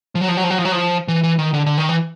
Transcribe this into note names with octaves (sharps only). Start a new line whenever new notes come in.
F3
F#3
F3
F#3
F3
F#3
F3
F#3
F3
E3
E3
D#3
D3
D3
D#3
E3